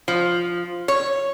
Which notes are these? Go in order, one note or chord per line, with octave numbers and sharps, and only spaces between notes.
F3
C#5